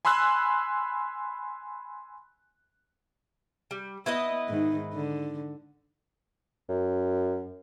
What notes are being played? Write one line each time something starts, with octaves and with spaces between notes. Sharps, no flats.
G#5 B5 C6 E6 F#6
G3
B3 E4 B4 D#5
G#2 D#3
D3
F#2